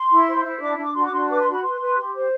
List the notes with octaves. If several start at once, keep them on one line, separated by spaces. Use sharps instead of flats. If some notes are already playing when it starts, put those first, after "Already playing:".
Already playing: C6
E4
C5
E4
D4 D6
D4 D6
F#4 C6
D6
D4 C6
B4 D6
C6
F#4
B5
B4 C6
B4
G4
C5